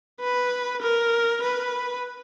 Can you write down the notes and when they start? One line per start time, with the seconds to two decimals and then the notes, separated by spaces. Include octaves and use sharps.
0.21 B4
0.82 A#4
1.43 B4